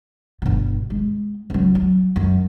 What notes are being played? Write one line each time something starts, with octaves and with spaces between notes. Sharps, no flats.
G1 B2
G#3
C#2 F#3
F#3
F#2